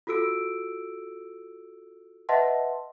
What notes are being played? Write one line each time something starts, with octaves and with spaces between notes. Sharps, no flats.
F4 F#4 A4 E6 D7
B4 D#5 E5 F#5 A5 C6